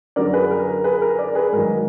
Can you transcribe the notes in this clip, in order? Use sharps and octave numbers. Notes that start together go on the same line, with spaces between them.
F#2 D3 F#3 A#4 D5
G#4 B4
A#4
A#4
G#4 B4
A#4
A#4 D5
G#4 B4
G#2 D#3 F#3 A#4